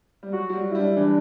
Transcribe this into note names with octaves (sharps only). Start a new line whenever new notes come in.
G3
F#3 F#4
F#3
G3
F#4
E4
G3 D4
E4
E3 D4